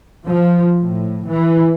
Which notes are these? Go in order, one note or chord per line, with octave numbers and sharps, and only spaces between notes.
F3
A2
E3